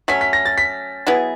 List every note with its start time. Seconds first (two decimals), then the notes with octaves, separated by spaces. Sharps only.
0.08 F#3 A3 C#4 B6
0.21 B6
0.33 A#6
0.45 A6
0.58 B6
1.07 F#3 B3 E4 G#4